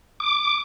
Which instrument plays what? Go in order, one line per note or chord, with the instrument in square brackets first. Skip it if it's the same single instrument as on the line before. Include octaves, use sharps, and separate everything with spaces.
[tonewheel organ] D6